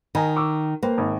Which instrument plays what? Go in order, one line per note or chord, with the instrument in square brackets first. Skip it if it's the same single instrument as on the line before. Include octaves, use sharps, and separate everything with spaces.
[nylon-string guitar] D#3 [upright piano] D#5 G#5 A#5
[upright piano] C#6 D6 E6
[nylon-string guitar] A#3 [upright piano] B4 C5 G5
[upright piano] G#1